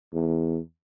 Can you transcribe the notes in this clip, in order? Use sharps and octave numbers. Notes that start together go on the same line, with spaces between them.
E2